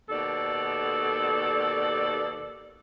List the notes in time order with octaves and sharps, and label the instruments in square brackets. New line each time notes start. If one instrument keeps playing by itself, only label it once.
[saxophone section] D#2 B2 A4 D5